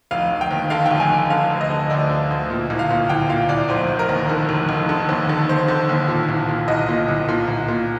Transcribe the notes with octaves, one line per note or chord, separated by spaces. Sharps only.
F1 F5
F1
G5
D#2
D3 F5
G5
F1
G#5
F1
D3 F5
D2
D#5
D3
D2 D5
D3
D2
A#2
C2
F5
A#2
C2 G5
A#2 F5
C2 D5
F1 C5
F1
A#4
D#2
D3 A#4
F1
F1
D3
D#2
D3
D#2 C5
D3
D#2
A#2
C2
A#2
C2 D#5
A#2
C2
A#2
C2
A#2